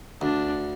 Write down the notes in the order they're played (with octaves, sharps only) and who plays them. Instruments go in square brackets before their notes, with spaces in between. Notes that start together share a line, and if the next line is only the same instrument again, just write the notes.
[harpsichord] D2 [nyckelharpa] D4